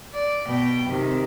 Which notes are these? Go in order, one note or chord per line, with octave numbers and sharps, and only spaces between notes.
D5
B2 G5
C3 D#3